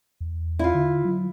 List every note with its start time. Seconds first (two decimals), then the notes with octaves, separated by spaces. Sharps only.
0.21 E2
0.59 E4 F4
0.74 D3
1.05 F#3